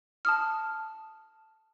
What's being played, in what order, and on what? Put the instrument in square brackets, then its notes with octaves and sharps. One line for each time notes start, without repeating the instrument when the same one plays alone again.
[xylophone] A5 D#6 F6